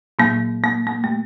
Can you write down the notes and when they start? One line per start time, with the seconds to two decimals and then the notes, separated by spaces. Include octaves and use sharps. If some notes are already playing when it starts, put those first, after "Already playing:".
0.19 A#2 F#3 A#3
0.64 A#3
0.87 A#3
1.04 A3